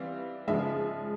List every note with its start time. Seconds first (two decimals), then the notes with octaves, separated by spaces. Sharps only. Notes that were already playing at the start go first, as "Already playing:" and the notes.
Already playing: E3 G3 C4 F5
0.48 C#3 F3 G#3 E5